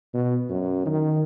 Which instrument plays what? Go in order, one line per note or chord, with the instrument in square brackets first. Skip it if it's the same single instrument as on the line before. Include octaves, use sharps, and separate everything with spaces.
[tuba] B2
F#2
D#3